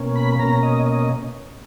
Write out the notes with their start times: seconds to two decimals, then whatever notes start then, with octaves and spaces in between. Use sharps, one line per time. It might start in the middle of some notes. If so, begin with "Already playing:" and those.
Already playing: B2 A#3 C#4
0.16 B5
0.39 B2 A#3 C#4 A#5
0.63 D#5
0.86 D#5